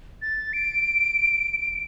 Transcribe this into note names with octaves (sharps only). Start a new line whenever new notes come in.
A6
D7